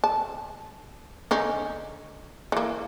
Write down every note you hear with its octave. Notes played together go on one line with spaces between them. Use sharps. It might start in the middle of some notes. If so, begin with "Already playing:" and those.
A5
D3 C#4 D#4
E3 A#3